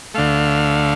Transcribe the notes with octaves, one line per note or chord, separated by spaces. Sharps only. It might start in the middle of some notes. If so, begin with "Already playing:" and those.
D2 D3 A3 F5